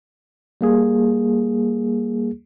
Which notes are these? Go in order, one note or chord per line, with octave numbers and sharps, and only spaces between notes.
G3 A#3 G#4